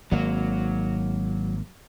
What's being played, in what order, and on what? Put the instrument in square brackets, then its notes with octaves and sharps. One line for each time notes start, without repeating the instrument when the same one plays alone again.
[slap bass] G#1 A#3 [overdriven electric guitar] F#3